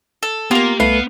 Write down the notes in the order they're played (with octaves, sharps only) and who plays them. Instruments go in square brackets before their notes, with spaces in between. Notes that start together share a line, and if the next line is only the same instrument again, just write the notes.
[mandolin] A4
[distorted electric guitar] A#3 [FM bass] B3 [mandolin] F4 A#4 [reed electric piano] G4
[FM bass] C2 [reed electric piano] A3 B4 [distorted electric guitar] B3 [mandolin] F5